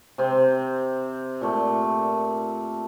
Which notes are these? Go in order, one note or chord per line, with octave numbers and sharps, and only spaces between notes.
C3 C4
A#2 A3